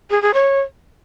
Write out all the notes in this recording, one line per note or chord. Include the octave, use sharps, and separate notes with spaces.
G#4
G#4
C#5